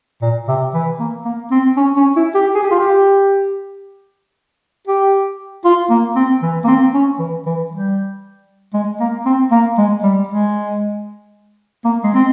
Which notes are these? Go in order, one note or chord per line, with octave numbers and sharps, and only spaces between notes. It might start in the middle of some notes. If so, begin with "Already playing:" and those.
A#2
C3
E3
A#3
A#3
C4
C#4
C#4
E4
G4
G#4
G4
F4
G4
G4
F4
A#3
C4
E3
A#3
C4
C#4
E3
E3
G3
G#3
A#3
C4
A#3
G#3
G3
G#3
A#3
G#3
C4